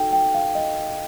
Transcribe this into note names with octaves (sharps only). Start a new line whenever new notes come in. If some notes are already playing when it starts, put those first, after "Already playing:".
Already playing: D#4 F#4 A4 G5
G5
F5
D#5